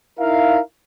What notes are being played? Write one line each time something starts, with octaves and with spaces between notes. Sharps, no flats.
D#4 E4 A#4 E5 F5